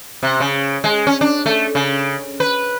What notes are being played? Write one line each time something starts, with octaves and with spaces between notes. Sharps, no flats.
C3
C#3
G#3
C#4
D4
A3
C#3
B4